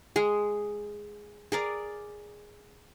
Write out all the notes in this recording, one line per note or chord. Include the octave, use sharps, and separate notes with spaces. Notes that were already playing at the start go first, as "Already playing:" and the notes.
G#3 G#4
G#4 A#4 D5